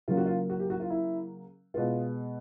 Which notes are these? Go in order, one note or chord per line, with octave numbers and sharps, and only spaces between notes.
C#3 F#3 A#3 F4
F#4
F4
F#4
G4
F#4
F4
E4
B2 G#3 B3 F4